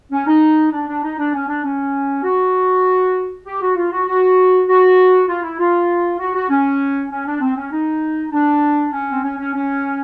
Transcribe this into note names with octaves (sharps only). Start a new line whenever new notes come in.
C#4
D#4
D4
D4
D#4
D4
C#4
D4
C#4
F#4
G4
F#4
F4
F#4
F#4
F#4
F4
E4
F4
F#4
F#4
C#4
C#4
D4
C4
C#4
D#4
D4
C#4
C4
C#4
C#4
C#4